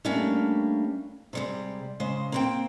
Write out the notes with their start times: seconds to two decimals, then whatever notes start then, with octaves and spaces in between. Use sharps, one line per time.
0.05 G3 A3 A#3 C#4 D4
1.33 C3 G3 G#3
2.00 C#3 G#3 C5
2.32 A#3 C4 G5